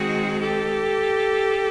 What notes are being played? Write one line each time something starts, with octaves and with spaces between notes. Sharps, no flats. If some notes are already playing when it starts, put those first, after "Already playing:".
Already playing: D#3 G#3 C4 F#4 G#4
G4 A4